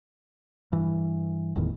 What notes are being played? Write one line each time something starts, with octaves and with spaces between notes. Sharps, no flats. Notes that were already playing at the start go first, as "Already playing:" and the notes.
G2 E3
F#1 E2 A2 D#3